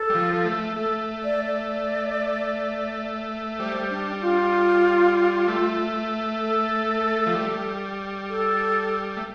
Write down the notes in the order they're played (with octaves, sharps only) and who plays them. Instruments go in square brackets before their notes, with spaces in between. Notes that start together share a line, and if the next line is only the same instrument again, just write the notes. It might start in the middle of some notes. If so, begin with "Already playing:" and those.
Already playing: [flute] A4
[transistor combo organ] G3
F3
A3
[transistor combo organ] A3 [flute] A4
[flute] D5
D5
[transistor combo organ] G3 [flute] C5
[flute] D4
F4
[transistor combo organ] A3
[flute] A4
[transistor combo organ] F3
G3
[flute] A4
[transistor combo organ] A3